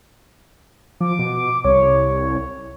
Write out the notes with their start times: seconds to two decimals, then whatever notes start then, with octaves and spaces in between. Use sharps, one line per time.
1.00 F3 D6
1.19 B2
1.65 C2 C#5